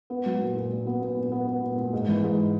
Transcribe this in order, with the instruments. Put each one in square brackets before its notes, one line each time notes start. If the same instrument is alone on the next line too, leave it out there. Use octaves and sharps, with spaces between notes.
[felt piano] B3
F#3
A#2
A#2
A#2
B3
B3
A#2
B3
B3
A#2
A#2
G#2
E3
G#2